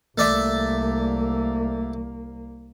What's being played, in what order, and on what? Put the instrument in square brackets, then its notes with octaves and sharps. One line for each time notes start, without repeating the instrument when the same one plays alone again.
[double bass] C2 A#3 [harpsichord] A3 D5 E5